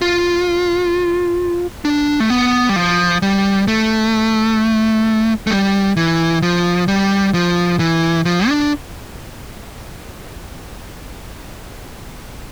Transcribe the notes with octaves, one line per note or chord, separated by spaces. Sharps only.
F4
D4
A3
B3
G3
F3
G3
A3
A3
G3
E3
F3
G3
F3
E3
F3
D4